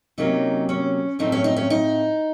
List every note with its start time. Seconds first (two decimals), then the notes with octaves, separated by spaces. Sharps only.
0.18 C3 F#3 A#3 C#4 D#4
0.69 C#4
1.19 A2 F3 A3 C4 D#4
1.32 C#4
1.44 D#4
1.56 C#4
1.70 D#4